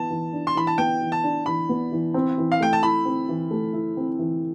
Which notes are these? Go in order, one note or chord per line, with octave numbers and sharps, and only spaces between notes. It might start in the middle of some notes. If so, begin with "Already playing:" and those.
Already playing: E3 B3 A5
E3
D4
C6
E3 B5
A5
B3 G5
E3
A5
D4
E3 B5
B3
E3
C4
E3
F5
A3 G5
A5
E4 B5
C4
E3
A3
E4
C4
E3